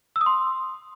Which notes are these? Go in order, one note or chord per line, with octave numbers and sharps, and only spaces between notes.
E6
D#6
C6